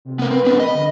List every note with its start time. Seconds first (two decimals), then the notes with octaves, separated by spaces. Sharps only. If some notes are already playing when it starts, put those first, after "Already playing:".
0.05 C3
0.19 B3 A#4
0.31 C4 B4
0.45 B3 D4 A#4
0.60 D#5 B5
0.75 D3